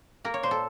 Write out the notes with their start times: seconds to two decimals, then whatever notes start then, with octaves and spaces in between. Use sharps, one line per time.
0.25 A#3 A#4
0.34 C#5
0.43 A#2 C5
0.51 A4